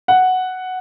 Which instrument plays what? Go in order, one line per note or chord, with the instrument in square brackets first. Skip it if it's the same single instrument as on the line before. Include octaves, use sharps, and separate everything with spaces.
[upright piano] F#5